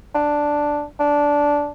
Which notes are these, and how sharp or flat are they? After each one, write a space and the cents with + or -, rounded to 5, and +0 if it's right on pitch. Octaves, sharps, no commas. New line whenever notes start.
D4 +0
D4 -10